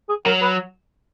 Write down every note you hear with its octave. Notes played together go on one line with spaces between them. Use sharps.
G#4
F#3 A#4
B4